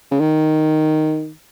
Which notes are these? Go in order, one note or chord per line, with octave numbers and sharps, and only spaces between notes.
C#3
D#3